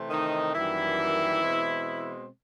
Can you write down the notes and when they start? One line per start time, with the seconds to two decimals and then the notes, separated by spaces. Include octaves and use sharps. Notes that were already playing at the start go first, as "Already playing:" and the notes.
Already playing: C3 E3 A3 C4
0.09 D#3 D#4
0.53 F#2 D#3 E3 G3 A#3 E4
1.40 B2 G#3 C4